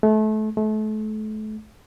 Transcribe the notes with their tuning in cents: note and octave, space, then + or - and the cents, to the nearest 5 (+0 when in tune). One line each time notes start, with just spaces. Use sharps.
A3 -30
A3 -35